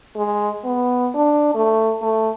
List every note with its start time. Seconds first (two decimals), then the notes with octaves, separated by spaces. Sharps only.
0.16 G#3
0.65 B3
1.15 D4
1.55 A3
2.02 A3